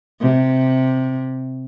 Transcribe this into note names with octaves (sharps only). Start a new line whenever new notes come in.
C3